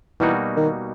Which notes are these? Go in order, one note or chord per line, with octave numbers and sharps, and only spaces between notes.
B2 E3 G3 A#3 D#4 F#4
D#3